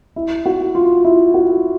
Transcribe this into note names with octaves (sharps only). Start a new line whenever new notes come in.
E4
F#4
F4
E4
F#4